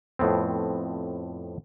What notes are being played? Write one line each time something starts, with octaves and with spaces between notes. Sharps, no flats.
F2 A2 B3 C4